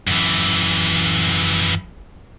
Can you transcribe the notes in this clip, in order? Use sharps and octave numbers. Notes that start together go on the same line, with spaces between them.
F#2 E3